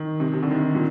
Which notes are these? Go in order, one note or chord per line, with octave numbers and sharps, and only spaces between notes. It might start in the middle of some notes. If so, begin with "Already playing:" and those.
Already playing: D#3
C3
C3
D3
D#3
A#2